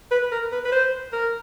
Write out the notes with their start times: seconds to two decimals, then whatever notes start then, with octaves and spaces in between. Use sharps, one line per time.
0.11 B4
0.32 A#4
0.52 B4
0.65 B4
0.72 C5
1.13 A#4